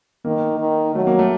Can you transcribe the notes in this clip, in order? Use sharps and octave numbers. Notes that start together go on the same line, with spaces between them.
D#3 A#3
D#3
F#3 A3
A#3
A3